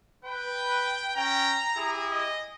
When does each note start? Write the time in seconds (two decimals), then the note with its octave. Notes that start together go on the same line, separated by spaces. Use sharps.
0.25 B4 G5
1.16 C#4 G5 A#5
1.76 E4 G4 G#4
2.12 D#5